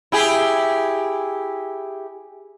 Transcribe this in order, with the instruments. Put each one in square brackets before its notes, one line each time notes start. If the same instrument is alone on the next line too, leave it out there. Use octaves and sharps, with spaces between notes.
[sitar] E4 G4 G#4